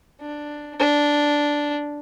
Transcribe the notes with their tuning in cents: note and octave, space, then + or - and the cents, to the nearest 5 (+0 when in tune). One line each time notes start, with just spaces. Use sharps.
D4 +5
D4 -5